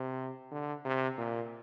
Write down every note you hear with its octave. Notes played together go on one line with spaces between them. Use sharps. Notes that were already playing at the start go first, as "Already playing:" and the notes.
Already playing: C3
D3
C3
A#2